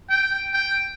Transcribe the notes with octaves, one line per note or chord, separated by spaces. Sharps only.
G5
G5